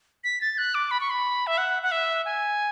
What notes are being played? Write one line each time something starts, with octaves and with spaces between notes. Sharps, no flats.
B6
A6
F#6
D6
B5
C#6
B5
E5
F#5
F#5
E5
G#5